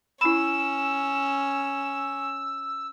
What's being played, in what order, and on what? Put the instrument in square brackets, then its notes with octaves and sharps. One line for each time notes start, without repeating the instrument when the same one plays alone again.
[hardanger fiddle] C#4 [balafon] E4 B5 [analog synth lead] E6 [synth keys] E7